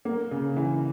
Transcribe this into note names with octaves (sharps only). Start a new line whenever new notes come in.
A#3
C#3
E3